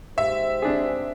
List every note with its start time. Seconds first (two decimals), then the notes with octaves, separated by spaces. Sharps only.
0.18 G#2 G4 C5 E5
0.62 C4 D4 G#4